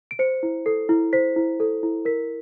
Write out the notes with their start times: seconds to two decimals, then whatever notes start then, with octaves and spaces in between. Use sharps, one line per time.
0.11 D7
0.19 C5 C#7
0.43 E4
0.66 A4 C7
0.89 E4
1.13 C5 B6
1.36 E4
1.60 A4
1.83 E4
2.05 A#4 B6